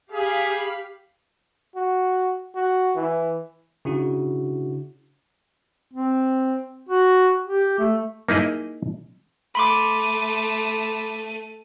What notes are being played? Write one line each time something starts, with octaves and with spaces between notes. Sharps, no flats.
G4 G#4 F5 B5
F#4
F#4
E3
C#3 D4 E4 F#4
C4
F#4
G4
A3
A#3 D#4 E4 G#4 D#5
A3 B5 C6 D6 D#7